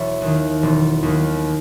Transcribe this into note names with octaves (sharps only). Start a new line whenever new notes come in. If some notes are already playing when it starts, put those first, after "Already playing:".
Already playing: E1 C#5 E5 G#5
D#2
D#3
E1
D#2
D#3